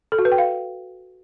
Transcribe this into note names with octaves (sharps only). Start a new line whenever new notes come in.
A4
F#4
B4
G5
F5